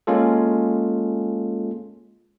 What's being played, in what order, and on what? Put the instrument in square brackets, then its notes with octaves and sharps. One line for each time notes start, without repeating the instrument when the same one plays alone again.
[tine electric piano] G#3 A#3 C#4 F4 A4